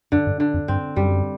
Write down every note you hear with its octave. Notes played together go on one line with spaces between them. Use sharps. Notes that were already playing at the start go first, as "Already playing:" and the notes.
F#2 D3
G2
D3
F2
G2 C4
F#2 G3